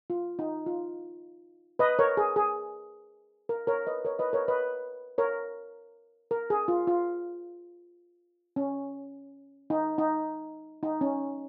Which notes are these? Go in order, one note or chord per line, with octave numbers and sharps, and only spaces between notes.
F4
D#4
F4
B4 D#5
A#4 C#5
G#4
G#4
A#4
A#4 C#5
B4 D#5
A#4 C#5
B4 D#5
A#4 C#5
B4 D#5
A#4 C#5
A#4
G#4
F4
F4
C#4
D#4
D#4
D#4
C#4